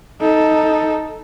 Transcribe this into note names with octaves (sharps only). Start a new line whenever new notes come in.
D#4 A4